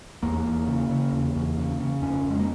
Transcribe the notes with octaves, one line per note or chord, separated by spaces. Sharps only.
E2 A#3
E2
C#3
C#3
E2
E2
C#3
C#3
F2 C#4
F2
G#3
A#3